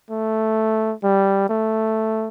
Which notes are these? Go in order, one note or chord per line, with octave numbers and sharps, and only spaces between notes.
A3
G3
A3